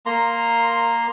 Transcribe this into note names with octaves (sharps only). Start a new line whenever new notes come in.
A#3 A#5 C6